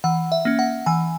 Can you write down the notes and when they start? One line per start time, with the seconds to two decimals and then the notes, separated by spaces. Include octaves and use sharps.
0.04 E3 F#5
0.32 E5
0.45 A#3 C#4
0.59 F#5
0.86 E3 G#5